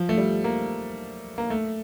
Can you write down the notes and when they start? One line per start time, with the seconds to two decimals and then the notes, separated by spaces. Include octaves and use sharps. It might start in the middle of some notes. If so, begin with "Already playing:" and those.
Already playing: F3
0.09 A3
0.18 G3
0.44 A#3
1.38 A#3
1.50 A3